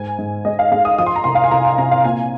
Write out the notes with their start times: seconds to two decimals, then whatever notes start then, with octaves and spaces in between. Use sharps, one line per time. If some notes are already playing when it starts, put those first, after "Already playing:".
Already playing: G#2 G#5
0.19 G#2
0.45 G#3 D#5
0.59 F5
0.72 G#3 F5
0.85 D#6
0.98 F3 D#6
1.06 C6
1.16 A#5
1.24 C2 C6
1.35 F5
1.44 G#5
1.51 C2 A#5
1.65 G#5
1.78 C3 A#5
1.91 F5
2.04 A#2 G#5